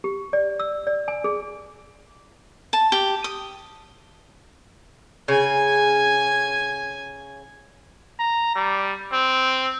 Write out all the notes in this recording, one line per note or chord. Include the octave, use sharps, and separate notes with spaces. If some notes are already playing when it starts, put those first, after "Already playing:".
G4
D5
E6
D5
G#5
G#4
A5
G4
D#6
C#3 G#5 G#6
A#5
G3
C4